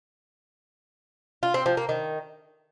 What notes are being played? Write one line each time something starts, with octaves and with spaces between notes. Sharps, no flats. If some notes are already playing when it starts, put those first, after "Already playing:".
F4
C4
F3
A#3
D#3